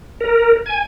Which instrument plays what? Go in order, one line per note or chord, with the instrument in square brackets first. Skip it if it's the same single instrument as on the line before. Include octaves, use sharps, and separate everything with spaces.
[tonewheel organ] A#4
G#5